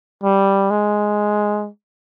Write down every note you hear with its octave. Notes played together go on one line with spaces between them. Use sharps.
G3
G#3